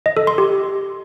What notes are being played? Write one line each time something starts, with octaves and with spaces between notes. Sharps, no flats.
D#5
A4
C6
G4